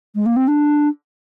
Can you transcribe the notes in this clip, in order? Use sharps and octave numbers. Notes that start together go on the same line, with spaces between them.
G#3
A#3
C4
D4